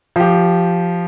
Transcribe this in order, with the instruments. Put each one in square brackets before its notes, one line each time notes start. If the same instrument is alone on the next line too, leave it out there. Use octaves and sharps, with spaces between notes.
[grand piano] F3 G4